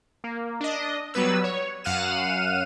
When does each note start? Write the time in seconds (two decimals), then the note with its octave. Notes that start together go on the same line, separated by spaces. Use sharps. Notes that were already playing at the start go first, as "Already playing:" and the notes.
0.24 A#3
0.60 D4 D#5
1.14 F#3 G3 B3 B4 E6
1.44 C#5
1.84 F#2 F5 F#5 F6 D#7 E7